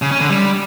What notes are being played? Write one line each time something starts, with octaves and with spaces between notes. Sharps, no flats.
C#3
C#4
D3
G3